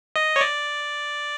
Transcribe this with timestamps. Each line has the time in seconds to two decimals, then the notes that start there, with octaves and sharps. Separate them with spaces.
0.16 D#5
0.36 C#5
0.41 D5